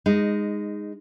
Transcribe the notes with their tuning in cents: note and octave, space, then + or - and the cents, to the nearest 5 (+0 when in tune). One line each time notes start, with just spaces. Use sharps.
G#3 -15 D#4 +0